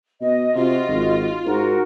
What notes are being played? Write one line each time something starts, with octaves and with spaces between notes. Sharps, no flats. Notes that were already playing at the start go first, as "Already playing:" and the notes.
B2 D#5
C3 F4 F#4 D#5
G#1
G#2 F#4 A#4